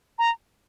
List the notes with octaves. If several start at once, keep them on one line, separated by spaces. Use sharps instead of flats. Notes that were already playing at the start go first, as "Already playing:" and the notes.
A#5